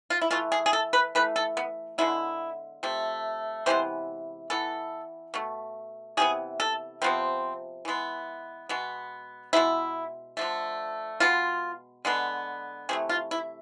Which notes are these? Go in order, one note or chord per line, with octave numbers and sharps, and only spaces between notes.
F4
E4
E3 A3 F4
G#4
G#4
A4
B4
E3 A3 B4
A4
B3
D3 G#3 B3 E4
C3 F3 A3
C3 E3 G#3 B3 C5
E3 B3 A4
B2 A3
C3 E3 B3 G#4
A4
C3 F3 B3 C4
E3 G#3 B3
B2 G#3 B3
B2 G#3 B3 E4
D3 F3 A3
B2 G#3 B3 F4
D3 G#3 B3
C3 E3 A3 G#4
F4
E4